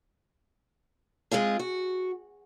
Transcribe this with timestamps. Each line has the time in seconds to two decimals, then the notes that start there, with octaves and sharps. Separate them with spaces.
1.31 G#3 C4 F4 G#4
1.59 F#4